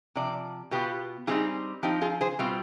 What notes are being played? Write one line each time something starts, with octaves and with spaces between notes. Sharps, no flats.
C3 F3 D5
B2 B3 F4 G4 B4
G3 C4 D#4 F4 G#4
F3 C4 D#4 G4
F4 G#4
G#4 C5
B2 G3 C4 F4